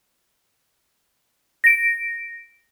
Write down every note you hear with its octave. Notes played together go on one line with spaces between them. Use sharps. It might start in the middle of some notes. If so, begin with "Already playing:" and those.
A#6 D7